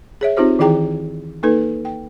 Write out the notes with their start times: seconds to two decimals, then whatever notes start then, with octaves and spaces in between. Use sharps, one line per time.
0.21 G#4 C#5 E5
0.37 C4 D#4 F4 G4 C5
0.59 D#3 E3 E4 G#4 G5 A#5
1.43 A#3 D#4 A4 B4
1.85 G5